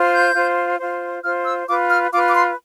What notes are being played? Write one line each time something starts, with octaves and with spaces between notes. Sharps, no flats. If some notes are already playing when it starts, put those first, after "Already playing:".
Already playing: F4 C5
G6
F4 C5
F4 C5
F4 C5 F6
E6
F4 B4 D6
F6
F4 B4 D6
D6
C6